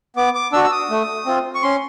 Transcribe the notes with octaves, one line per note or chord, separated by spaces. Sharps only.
B3 D6
D6
D4 F#4 E6
E6
D#6
A3
C4 F4
C#6
C#4 C6